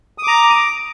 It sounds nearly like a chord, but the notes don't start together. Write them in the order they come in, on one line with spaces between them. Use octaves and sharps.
D#6 D6 A#5